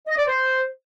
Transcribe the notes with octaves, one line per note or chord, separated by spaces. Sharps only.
D#5
D5
C5